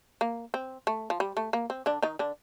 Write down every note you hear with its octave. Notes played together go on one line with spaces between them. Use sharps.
A#3
C4
A3
F3
G3
A3
A#3
C4
D3 D4
D#3 D#4
D3 D4